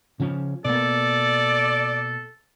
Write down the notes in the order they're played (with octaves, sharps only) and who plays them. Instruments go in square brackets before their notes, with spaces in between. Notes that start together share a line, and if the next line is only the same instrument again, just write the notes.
[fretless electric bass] C#3 F3 C#4
[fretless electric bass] B2 A#3 [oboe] A4 [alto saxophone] D5